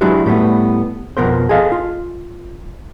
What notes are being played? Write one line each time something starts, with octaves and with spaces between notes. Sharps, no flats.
F#3 G#3 D4 E4 F#4 G4
A2 G3 A3 B3
F2 B2 B3 A#4 C5
G#4 A4 D#5 F5
F4